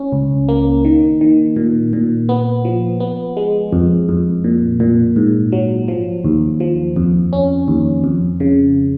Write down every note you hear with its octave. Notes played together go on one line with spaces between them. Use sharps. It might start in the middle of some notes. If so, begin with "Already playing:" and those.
Already playing: C#4
C#2
A#3
D#3
D#3
A#2
A#2
B3
F3
B3
G#3
F2
F2
A#2
A#2
G#2
F#3
F3
D#2
F3
F2
C#4
D#2
F2
C#3